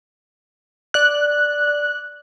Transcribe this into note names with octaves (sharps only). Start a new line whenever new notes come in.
D5 F#6